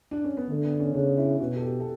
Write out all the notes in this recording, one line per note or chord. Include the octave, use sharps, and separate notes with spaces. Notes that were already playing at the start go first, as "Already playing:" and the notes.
D4
C#4
B3
D3 A3
B3
C#4
C#3 D4
E4
B2 F#4
A4
G4
A4